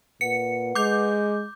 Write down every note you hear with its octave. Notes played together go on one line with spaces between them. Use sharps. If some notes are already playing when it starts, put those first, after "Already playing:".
A#2 B4 F#5 C#7
G#3 D6 G6